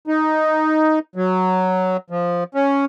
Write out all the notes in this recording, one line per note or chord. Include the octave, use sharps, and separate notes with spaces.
D#4
F#3
F3
C#4